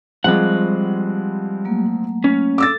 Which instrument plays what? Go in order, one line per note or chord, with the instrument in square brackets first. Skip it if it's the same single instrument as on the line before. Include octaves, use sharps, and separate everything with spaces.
[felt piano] F3 G#3 C4 [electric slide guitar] G3 F#5
[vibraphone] F#3 A3 A#3
[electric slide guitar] C#4
[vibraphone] A4 [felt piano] D6 E6 A6